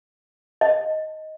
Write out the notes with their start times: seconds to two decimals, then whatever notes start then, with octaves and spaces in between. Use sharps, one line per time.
0.61 D#5